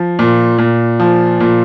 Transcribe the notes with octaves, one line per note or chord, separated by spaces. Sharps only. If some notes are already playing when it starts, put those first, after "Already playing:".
Already playing: F3
A#2
A#2
F3
A#2